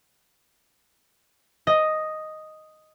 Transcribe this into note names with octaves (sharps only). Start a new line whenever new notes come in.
D#5